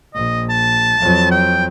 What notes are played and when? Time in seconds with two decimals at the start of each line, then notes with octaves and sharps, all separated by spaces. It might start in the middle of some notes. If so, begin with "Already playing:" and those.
0.14 A#1 D#5
0.50 A5
1.00 F2 F#3
1.31 G5